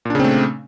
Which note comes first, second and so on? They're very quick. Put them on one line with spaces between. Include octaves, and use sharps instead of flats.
A#2 D4 C#3 C4 A3